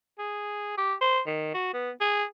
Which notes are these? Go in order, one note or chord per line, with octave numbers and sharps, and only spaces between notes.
G#4
G4
C5
D#3
F#4
B3
G#4